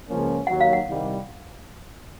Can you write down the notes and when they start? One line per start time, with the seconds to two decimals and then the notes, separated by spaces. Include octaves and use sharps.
0.08 C#2 C#3 F3 A#3 C#4
0.47 D#2 D#3 F#3 F#5
0.60 F5
0.73 F#5
0.86 C2 C3 D#3 G3